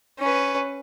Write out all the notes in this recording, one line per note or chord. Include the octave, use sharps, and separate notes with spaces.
C#4 B4